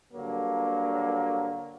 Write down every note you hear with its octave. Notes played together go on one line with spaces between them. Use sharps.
G2 D3 F#3 A#3